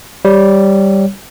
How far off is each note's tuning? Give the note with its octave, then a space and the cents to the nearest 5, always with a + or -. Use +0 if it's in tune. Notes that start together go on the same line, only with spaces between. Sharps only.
G3 +0 C#5 +0